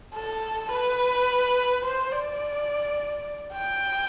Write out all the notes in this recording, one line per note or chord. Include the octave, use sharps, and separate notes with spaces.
A4
B4
C5
D5
G5